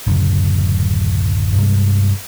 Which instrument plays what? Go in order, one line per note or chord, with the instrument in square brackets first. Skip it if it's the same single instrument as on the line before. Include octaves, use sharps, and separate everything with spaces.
[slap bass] D1 F#2 C#3
G2 C3 G3 G#3